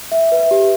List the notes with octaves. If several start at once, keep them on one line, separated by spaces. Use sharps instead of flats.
E5
B4
G4